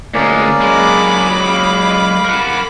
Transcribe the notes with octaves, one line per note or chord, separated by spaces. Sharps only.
D2 G#3 A#3 C#4 D5
F#3 G#3 B5 D6
F5
A#4 F#5